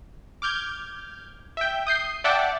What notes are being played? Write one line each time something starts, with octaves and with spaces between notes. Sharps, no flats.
D6 F6 G6 G#6
E5 G5
D#6 G6 C7
D5 E5 F#5 G5 A5 D6